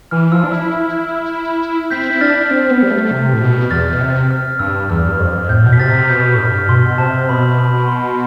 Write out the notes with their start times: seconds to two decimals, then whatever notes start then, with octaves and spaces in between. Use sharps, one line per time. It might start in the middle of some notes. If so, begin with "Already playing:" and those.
0.11 E3 F6
0.32 F3 E6
0.44 D4
0.52 E4 E6
1.91 C4 G6 B6
2.10 E4
2.21 D4 F6 A6
2.51 C4
2.71 B3
2.83 G3
2.90 A3
3.11 C3
3.33 A2
3.41 B2
3.70 E2 F6 A6
3.93 B2
4.01 C3
4.31 F6
4.59 G2 E6
4.90 E2 F6
5.08 G2
5.20 F2
5.49 A2 G6
5.64 B2
5.73 B6
5.79 C3 F6 A6
5.94 C3
6.09 B2 G6
6.35 A2
6.39 G2 F6
6.68 B2 C6
6.90 B2
6.98 C3 A5
7.29 B2 B5
7.59 B5
7.88 C6